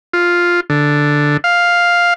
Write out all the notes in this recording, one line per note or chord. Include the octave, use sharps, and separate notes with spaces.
F4
D3
F5